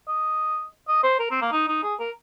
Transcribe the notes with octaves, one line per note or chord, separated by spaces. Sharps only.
D#5
D#5
C5
A#4
C4
A#3
D#4
D#4
G#4
A#4